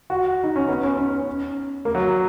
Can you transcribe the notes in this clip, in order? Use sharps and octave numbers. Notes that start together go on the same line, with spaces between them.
F#4
D#4
C#4
B3
C#4
C#4
A#3
F#3